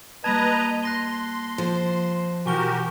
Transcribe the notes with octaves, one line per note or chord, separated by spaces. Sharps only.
G3 A#3 B4 D#5 A5 A#5 G#6
C6 F#6 A#6 G7
F3 C5
B2 E3 F#4 G4 A#4 G#5 C#6 G7